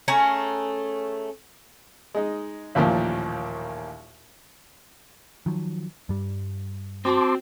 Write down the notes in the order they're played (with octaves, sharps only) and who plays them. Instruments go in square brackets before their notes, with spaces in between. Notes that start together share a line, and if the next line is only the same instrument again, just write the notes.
[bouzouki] A3 C#4 G#4 A#5
[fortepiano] G#3 D#4
A1 D#2 A#2 F3
[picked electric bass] D#3 F3 F#3
G2 G3
[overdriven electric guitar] C4 [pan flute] F#4 [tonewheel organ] A5 C6 D6